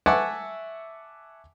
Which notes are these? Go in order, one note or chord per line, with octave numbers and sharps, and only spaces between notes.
E5 F#5 G#5 A5 C#6 D6